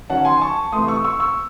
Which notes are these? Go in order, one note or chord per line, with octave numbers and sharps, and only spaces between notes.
D#3 F#3 C#4 F#5 A5
G#5 C6
A5 C#6
C3 E3 A3 C6 D#6
C#6 E6
C#6 E6
C#6 E6